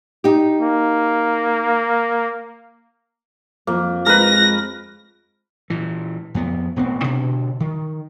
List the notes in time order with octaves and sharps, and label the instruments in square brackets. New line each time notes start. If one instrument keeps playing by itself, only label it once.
[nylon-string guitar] D#4 G4
[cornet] A#3
[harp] F2 [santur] A#3
[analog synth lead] G#3 [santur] A#4 B4 [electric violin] A#6
[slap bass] A#2 E3
F2 B3
E1 A1 B3 C4
B2 D3
D#3